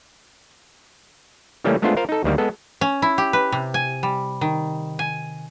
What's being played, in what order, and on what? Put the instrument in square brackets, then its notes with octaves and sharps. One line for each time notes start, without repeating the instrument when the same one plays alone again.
[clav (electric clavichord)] C#3 E3 G3 A3 A#3 C#4
G#3 A3 B3 D4 F4 C5
F4 A#4 C5 F5
D#4 A4
D2 D#3 G3 A#3
G#3 B3 A4
[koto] C#4
E4
G4
B4
C3
G#5
G3
D#3
G#5